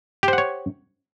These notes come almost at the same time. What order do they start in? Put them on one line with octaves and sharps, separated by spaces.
G4 C5 F#5 C#5